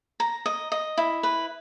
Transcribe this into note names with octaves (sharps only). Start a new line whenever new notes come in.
A#5
D#5
D#5
E4
B4